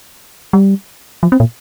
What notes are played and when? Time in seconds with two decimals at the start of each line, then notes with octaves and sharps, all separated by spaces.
0.53 G3
1.23 F3
1.32 C4
1.40 A#2